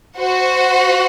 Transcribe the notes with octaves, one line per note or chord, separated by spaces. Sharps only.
F#4 C5 F#5